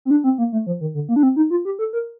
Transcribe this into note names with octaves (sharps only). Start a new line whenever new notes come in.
C4
D4
C4
A#3
A3
F3
D#3
D3
A#3
D4
C4
D#4
F4
G4
A4
A#4